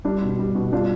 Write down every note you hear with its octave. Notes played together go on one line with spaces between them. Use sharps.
G3 D4
B2
G3
B2
G3 D4 F4